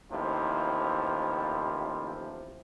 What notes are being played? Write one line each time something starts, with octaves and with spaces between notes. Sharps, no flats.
A1 D#2 C3 F3 E4